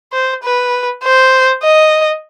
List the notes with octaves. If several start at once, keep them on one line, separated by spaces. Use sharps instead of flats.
C5
B4
C5
D#5